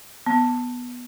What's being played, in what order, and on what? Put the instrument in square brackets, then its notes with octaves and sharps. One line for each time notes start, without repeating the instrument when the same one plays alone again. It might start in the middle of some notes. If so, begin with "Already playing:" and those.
[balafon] B3